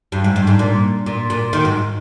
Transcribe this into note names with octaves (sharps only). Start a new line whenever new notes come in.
G2
G#2
G2
G#2
A#2
A#2
A#2
D#3
G#2